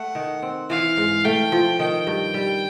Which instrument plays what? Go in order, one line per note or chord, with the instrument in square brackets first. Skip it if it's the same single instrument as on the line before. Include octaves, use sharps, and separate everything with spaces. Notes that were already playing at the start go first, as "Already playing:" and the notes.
Already playing: [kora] A3 [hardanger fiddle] F#5
[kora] D#3
C4
[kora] E3 [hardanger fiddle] F5
[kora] G#2
[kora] A3 [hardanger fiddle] G5
[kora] F3
[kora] D#3 [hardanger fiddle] G5
[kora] G2
G3